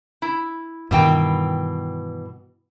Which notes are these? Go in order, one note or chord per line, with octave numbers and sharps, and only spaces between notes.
E4
G2 B2 D#3 E3 G5